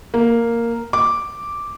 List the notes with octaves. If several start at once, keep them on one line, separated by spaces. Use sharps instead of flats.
A#3
D6